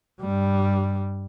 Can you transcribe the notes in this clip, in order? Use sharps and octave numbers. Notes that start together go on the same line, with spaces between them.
G2 G3